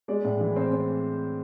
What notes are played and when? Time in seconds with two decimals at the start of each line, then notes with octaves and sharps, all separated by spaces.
0.08 G#3 D5
0.24 A2
0.40 E3
0.56 C4 C5
0.72 C4